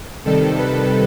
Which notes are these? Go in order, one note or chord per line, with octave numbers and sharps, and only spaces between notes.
C3 D#3 G3 A4
B4